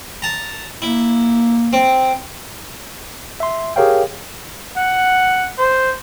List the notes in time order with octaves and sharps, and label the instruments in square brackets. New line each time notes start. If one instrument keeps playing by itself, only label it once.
[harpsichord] A5 A#5
[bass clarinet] A#3 [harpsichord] E4
[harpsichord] C4
[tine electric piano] E5 C6
G4 G#4 A#4 C#5 F5 G5
[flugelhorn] F#5
C5